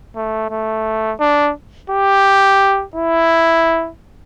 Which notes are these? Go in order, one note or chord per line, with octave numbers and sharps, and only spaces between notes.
A3
A3
D4
G4
E4